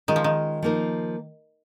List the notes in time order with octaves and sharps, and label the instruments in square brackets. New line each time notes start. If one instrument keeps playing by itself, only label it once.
[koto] D#3 [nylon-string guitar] G#3 C#4 F4
[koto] F3
D#3
[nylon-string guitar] F3 A#3 D#4 A#4